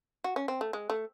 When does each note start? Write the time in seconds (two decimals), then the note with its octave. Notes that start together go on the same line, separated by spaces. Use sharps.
0.24 F#4
0.36 C#4
0.48 C4
0.61 A3
0.73 G#3
0.90 A3